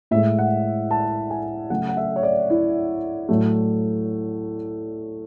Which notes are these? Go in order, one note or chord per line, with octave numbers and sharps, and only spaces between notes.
A2 G#3 E5
F#5
A5
G#5
C#3 F#3 A3 F#5
F#5
E5
C#5
D5
E4
A2 F#3 A3